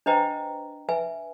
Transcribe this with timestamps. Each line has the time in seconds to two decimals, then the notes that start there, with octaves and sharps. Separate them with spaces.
0.06 D4 B4 C5 D#5 G5 A#5
0.89 B4 E5 G#5